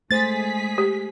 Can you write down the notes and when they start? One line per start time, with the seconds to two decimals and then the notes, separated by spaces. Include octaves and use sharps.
0.11 G#3 A3 G#4 C5 A6 B6
0.78 G4